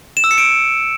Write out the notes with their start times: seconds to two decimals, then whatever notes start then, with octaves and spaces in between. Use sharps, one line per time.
0.17 E7
0.24 E6
0.31 C#7
0.38 D7